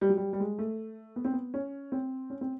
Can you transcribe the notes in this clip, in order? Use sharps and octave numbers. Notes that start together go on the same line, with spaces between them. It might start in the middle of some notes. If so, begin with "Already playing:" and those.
G3
F#3
G3
G3
G#3
A3
B3
C4
B3
C#4
C4
C#4
C4